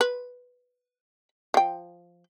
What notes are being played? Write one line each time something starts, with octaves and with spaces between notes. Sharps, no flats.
B4
F3 G5